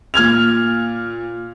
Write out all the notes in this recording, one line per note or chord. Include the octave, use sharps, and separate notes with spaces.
A#2 F6 G#6 F7